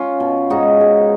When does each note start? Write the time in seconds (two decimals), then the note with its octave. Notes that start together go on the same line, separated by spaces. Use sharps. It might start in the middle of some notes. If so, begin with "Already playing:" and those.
Already playing: C#4 F4
0.20 B2
0.50 G#2 D#4 F#4
0.81 G#2